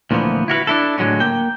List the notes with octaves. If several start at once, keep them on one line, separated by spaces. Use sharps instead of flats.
D2 A#2 E3 F3 B3
E4 F#4 A#4 B4
D4 E4 A4
A2 D3 F#3 G#3 C#4
A#3 G5